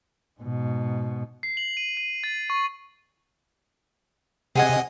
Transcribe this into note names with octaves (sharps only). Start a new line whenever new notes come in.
G#2 B2
C7
F#7
D#7
D#7
A6
C#6
C3 G#4 D#5 F#5 G#5